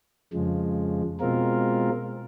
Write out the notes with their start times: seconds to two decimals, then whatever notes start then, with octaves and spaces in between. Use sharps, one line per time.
0.33 F2 C#3 F3 G#3
1.20 B2 G#3 C4 F4 A#4